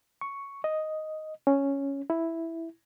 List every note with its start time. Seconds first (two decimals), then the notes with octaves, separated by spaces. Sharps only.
0.21 C#6
0.64 D#5
1.47 C#4
2.10 E4